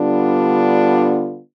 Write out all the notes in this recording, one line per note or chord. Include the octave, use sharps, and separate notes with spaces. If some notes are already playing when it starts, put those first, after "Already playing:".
Already playing: D3 G3 B3 D4 F4